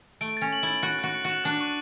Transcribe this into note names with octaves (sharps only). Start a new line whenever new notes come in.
A3 D7
C#4 A6
F#7
E4 A6
F#4 A6
F#4 F#6
C#7
F#4
E7
D4 F#6
C#6